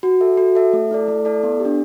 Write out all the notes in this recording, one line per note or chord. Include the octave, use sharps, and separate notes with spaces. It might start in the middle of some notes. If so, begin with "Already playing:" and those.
F#4
A4 E5
F#4
A4 E5
A3
E4 A4 D5
A3
E4 A4 D5
B3
G4
D4